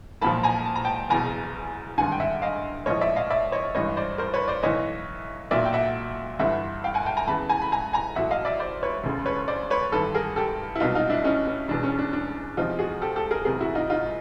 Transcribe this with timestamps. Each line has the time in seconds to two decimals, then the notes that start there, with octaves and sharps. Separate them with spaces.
0.21 B1 A#2 F3 A5 B5
0.43 G#5 A#5
0.65 A5
0.75 A#5
0.85 G5 A5
1.09 F#1 E2 B2 G#5 A#5
1.98 G#1 G2 D3 F#5 G#5
2.12 G5
2.20 E5 F#5
2.42 D#5 F5
2.86 A#1 A2 F3 C#5 D#5
3.01 D5 E5
3.16 D#5 F5
3.30 D5 E5
3.52 C#5 D#5
3.75 A1 G2 E3 C#5 D#5
3.97 C5 D5
4.18 A#4 C5
4.34 B4 C#5
4.48 C5 D5
4.63 B1 A2 E3 C#5 D#5
5.51 B1 A#2 F#3 D5 E5
5.65 G5
5.73 E5 F#5
6.39 G1 G2 E3 E5 F#5
6.84 F5 G5
6.94 F#5 G#5
7.06 G5 A5
7.17 G#5 A#5
7.27 E2 C#3 E3 A5 B5
7.49 G#5 A#5
7.62 B5
7.72 G#5 A#5
7.93 G#5 A#5
8.15 A1 A2 F#3 E5 F#5
8.31 D#5 F5
8.45 D5 E5
8.60 C5 D5
8.82 B4 C#5
9.04 E1 D2 C#3
9.26 B4 C#5
9.48 C5 D5
9.70 B4 C#5
9.92 A1 G2 D#3 A4 B4
10.15 G#4 A#4
10.36 G4 A4
10.75 E4
10.80 C2 B2 F#3 D#4 F4
10.95 D#4 F4
11.10 D4 E4
11.24 C#4 D#4
11.47 C#4
11.68 E1 E2 B2 D4
11.83 C#4
11.99 D4
12.13 D4
12.57 E2 C3 F3 D#4 F4
12.79 F#4 G#4
13.02 G4 A4
13.16 G4 A4
13.31 G#4 A#4
13.45 F#1 E2 C3 G#4 A#4
13.61 E4 F#4
13.75 D#4 F4
13.90 D#4 F4